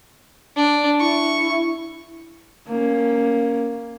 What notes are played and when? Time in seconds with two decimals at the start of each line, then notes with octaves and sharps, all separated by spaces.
0.56 D4
1.00 E4 C#6
2.69 A#3 C#4